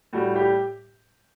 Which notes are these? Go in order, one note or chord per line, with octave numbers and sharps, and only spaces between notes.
A2 G3 F#4
G4